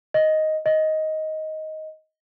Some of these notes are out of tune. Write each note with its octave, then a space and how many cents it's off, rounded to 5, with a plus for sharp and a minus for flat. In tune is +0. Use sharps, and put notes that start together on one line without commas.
D#5 +5
D#5 +10